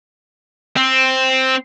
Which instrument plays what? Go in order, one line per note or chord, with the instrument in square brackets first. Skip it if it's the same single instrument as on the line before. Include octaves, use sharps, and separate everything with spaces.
[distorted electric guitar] C4